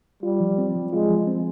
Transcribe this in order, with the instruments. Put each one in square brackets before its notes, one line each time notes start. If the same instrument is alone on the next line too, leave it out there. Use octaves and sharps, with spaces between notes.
[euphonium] G3 [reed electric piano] F4
[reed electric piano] F3
C4
F3
[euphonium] G#3 [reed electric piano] F4
[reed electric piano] F3
C4